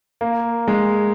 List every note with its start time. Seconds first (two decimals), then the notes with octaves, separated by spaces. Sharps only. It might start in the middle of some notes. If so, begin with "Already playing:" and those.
0.21 A#3
0.68 G#3